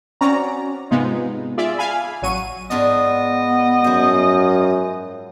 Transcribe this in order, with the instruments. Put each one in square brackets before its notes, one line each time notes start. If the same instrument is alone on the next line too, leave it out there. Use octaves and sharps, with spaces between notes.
[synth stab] C4 C#4 F#4 D5 A#5
G#2 C3 G#3 B3 D#4 F4
F4 G#4 D5 E5
F5 G#5 B5
A1 F#3 C#6 D#7
[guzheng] G#2 D4 F4 [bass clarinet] B3 [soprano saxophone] D#5
[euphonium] F#2 [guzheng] F3 C5